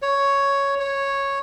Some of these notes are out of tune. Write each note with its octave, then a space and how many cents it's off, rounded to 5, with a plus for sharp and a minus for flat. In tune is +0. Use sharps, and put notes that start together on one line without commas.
C#5 +5
C#5 -5